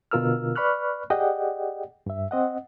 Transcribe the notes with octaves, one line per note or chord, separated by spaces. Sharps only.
B2 D3 F4 A#4 E6 F6
B4 D5 B5 C#6 F6 F#6
G4 G#4 D5 D#5 F#5 G5
G2 E5
C4 D#5 F#5